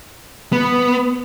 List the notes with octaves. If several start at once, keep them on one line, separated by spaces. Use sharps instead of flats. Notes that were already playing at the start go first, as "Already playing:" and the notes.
B3